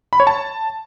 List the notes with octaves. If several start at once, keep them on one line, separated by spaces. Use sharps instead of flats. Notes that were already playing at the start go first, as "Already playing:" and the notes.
B5
C#5
A5